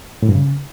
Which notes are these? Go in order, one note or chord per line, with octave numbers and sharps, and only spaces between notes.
A2
G2
C#3